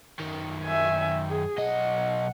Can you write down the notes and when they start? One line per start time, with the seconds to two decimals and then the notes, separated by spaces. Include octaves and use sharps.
0.20 F#2 D#3
0.64 E5 G#5
1.30 G#4
1.58 B1 D#5 F#5